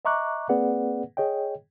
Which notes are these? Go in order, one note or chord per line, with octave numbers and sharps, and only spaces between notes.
D#5 E5 A#5 C#6 D6 F#6
A#3 C4 G#4 B4 D5 F#5
G#4 C#5 D#5 G5